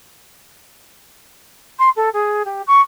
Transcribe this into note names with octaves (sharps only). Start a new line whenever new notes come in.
C6
A4
G#4
G4
C#6